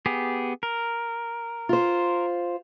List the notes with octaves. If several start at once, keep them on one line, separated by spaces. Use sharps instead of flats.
B3 G4 G#4
A#4
F4 C5